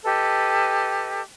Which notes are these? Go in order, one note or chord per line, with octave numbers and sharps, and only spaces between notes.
G4 A4 B4 D#5